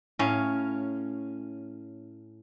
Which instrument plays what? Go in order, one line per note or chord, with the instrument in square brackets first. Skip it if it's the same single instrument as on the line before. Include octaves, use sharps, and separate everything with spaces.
[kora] A2 C#4 F5